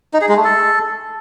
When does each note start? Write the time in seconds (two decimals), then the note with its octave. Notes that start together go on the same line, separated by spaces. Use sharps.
0.13 D#4
0.21 G#4
0.29 G#3
0.37 A3
0.44 A4